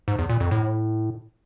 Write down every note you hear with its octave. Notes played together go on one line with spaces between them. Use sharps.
G#2
E2
A#2
F2
A2